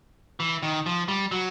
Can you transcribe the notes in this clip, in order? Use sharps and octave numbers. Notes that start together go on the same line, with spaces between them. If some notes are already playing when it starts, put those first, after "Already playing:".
E3
D#3
F3
G3
F#3